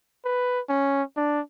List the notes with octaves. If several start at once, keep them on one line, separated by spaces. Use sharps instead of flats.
B4
C#4
D4